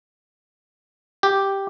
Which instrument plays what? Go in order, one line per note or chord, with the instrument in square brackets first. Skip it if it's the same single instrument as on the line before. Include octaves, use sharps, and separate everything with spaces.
[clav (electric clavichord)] G4